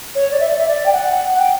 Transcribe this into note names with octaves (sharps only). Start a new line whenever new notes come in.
C#5
D5
E5
D5
E5
D5
G5
F#5
G5